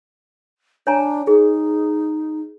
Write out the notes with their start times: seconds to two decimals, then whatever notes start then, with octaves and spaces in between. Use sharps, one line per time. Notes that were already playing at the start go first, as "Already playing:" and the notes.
0.87 D4 C#5 G#5 A#5
1.27 D#4 G#4